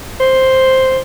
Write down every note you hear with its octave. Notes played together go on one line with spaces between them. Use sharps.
C5